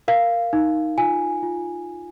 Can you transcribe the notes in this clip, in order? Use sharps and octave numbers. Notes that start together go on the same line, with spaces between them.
A#4 F5
D#4
F4 G#5
F4